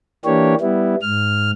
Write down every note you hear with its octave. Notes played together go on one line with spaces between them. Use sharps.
E3 A#3 D4 G4 C#5
G3 B3 E4
G#2 F6